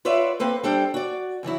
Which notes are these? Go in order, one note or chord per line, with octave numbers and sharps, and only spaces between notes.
F4 B4 C#5 D5 E5 F#5
A#3 C4 A4 B4 C5
G3 D4 A4 C5 G5
F#4 D5
F#2 E3 F#3 E4